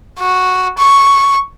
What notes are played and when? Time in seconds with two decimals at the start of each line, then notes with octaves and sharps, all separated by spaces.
0.19 F#4
0.78 C#6